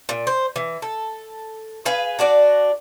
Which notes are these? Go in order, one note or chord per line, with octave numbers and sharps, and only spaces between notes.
A#2
C5
E3
A4
G#4 B4 F5 G#5
D4 F#4 D5